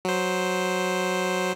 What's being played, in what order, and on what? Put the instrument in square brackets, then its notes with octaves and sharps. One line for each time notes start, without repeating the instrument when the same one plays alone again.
[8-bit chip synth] F#3 C5